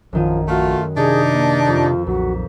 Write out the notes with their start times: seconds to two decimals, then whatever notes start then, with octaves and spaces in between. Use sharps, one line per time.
0.13 A#1 F#2 D#3 F3 D#7
0.48 A3 F4 F#4
0.97 C3 D4 D#4 G#4
1.32 A#3
1.67 F2 F4
2.07 B1 A#2 F#4 B6